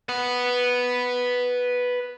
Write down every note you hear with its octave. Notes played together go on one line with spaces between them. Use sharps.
B4 F#5